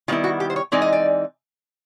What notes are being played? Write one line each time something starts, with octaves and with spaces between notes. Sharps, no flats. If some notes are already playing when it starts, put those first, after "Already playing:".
D#3 G3 B3 E4 F4
F#4
G4
C5
C#5
E3 G#3 C4 D#4 D5
D#5
D5